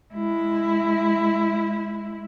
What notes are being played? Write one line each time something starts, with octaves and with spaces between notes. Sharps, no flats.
G#3 E4